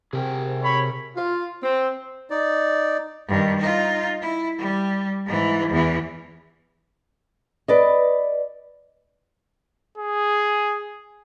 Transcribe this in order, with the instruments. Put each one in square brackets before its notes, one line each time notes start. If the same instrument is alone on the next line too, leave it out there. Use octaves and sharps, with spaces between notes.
[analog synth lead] C3 [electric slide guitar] G#4 A#4 G5
[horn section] C#5 B5
F4
C4
[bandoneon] D#4 D5
[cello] G2 D#3
D#4 F4
E4
G3
G#2 E3
E2 E3
[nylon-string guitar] B4 D5 D#5
[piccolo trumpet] G#4